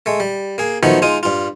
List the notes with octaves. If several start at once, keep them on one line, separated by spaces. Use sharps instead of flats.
G#3 A3
G3
A#3 G#4
D#3 F3 F#3 A3 B3 D#4
G#3 D#4 F4 D#6
G2 F4